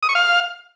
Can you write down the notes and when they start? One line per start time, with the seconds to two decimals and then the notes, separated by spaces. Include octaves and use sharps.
0.03 D#6
0.09 C#6
0.15 F5